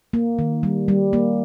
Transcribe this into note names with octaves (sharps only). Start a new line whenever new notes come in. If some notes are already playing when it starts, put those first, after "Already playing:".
A#3
D#3
G3
G3
A#3